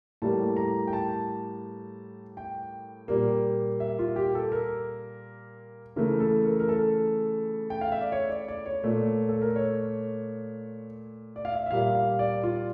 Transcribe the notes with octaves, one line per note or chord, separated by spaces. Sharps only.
A2 G3 A#3 A5
A#5
G5
A5
G5
A#2 G3 A#3
E5
F4
G4
A4
A#4
C#3 E3 A3 A#4
A4
A#4
A#4
A4
G5
F5
E5
D5
C#5
D5
D5
C#5
A#2 A3
A4
A#4
C#5
D5
F5
E5
E5
A#2 G3 A#3 F5
F5
D5
F4